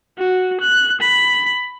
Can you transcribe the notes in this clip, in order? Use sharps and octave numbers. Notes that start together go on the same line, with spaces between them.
F#4
F#6
B5